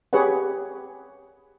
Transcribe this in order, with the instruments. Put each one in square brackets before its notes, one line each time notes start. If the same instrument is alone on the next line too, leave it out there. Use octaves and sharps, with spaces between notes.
[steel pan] G4 G#4 B4 C#5 F#5